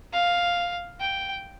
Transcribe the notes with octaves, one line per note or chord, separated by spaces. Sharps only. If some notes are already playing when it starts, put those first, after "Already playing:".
F5
G5